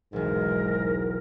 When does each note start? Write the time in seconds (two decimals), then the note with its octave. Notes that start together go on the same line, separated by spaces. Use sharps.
0.13 E1 B1 G#2 A#4